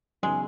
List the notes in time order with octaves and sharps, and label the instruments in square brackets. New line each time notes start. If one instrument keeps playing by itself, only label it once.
[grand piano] C#3 F#3 B3 D#4 G#4 [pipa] G#3